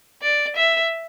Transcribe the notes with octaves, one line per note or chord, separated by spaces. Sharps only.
D5
E5